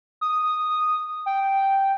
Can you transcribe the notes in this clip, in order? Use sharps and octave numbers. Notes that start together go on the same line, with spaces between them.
D#6
G5